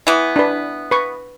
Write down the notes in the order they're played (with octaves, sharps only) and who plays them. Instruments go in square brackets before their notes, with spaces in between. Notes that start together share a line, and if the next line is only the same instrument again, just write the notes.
[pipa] E3 B3
[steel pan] D4 B4
B4 C#6